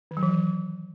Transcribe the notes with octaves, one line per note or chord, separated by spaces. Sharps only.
D#3
F#3
E3
F#3